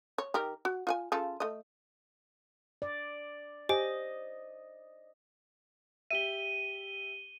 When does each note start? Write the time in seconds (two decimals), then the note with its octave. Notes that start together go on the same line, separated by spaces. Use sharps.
0.18 C#5
0.34 D#3 G4 A#4
0.65 F#4
0.87 F4 F#5 G#5
1.12 C#3 F4 A4
1.40 A3 D#5
2.82 D5
3.69 G4 C5 D#5 G#5 D7
6.11 G4 E5 D#7 G7